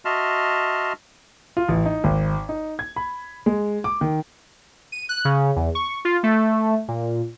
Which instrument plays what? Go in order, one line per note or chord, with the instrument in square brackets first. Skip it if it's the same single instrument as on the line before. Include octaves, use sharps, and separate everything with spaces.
[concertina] F#4 D#5 E5 A5 C6 F6
[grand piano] F4
A1
D#4
G#1
D#4
G#6
B5
G#3
D6
D#3
[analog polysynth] D#7
F#6
C#3
E2
C#6
F4
A3
A#2